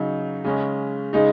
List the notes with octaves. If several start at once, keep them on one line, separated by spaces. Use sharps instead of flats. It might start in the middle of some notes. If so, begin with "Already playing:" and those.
Already playing: C#3 F#3 D#4
C#3 G#3 C#4
C#3 G#3 D#4